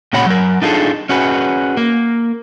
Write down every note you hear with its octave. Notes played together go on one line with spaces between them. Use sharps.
A#2 C#3 F#4 C#5 F#5 B5
F#3 A#4
D4 D#4 F4 G#4 A4
C#4 F#4 G#4 B4
A#3